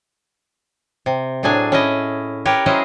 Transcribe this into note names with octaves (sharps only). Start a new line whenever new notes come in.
C3
A2 F#3 D4 G#4 G#5
C#4 E4 D#5
G4 A#4 B4 C#5
F#3 C#4 E4 G#4 C5 D#5